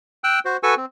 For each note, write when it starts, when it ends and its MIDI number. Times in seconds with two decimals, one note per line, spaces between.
0.24 0.39 79
0.24 0.39 88
0.24 0.39 90
0.45 0.57 66
0.45 0.57 72
0.63 0.75 66
0.63 0.75 69
0.63 0.75 71
0.63 0.75 80
0.63 0.75 85
0.63 0.75 88
0.77 0.85 60